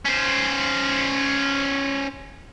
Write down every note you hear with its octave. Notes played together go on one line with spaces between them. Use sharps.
C#4 C5